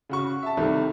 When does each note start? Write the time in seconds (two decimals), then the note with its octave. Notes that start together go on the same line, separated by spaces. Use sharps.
0.09 C#3 F#4 C#6
0.42 E5 A5
0.57 C2 C3 D#3 A3